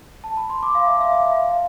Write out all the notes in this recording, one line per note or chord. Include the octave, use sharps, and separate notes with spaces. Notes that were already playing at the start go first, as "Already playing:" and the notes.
A5
B5
C6
D6
F5
E5
F5
E5
F5
E5